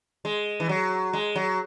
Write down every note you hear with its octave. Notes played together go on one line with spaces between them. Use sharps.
G#3
E3
F#3
G#3
F#3